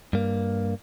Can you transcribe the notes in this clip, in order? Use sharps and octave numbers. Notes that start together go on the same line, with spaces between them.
G2 A#3